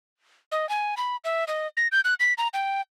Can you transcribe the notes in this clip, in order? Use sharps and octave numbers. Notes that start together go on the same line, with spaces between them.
D#5
G#5
B5
E5
D#5
A#6
G6
F#6
B6
A#5
G5